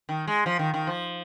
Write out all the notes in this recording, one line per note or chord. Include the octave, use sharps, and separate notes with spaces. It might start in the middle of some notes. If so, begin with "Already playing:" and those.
D#3
G#3
F3
D#3
D#3
F3